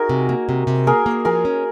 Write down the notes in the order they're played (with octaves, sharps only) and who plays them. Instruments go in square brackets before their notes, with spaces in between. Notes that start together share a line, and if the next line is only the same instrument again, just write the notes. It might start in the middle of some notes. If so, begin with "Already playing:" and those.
Already playing: [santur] D#4 F#4 G#4 A#4
[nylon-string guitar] C3
A#3
C3
C3
[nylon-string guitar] A#3 [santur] G#4 A#4
[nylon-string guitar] A#3
[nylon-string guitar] F3 [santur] G#4 A#4
[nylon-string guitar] C#4